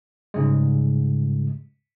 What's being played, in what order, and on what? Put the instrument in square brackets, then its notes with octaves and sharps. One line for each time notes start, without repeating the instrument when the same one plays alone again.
[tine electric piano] G#2 C#3 G3 G#3